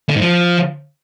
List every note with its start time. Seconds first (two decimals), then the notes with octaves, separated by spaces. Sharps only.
0.09 D3
0.15 G#2
0.21 F3